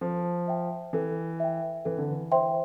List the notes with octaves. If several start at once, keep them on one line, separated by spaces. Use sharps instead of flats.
F3 A4
E5 G5
E3 A4
E5 G5
E3 A4
D3
E3
C5 E5 G5 C6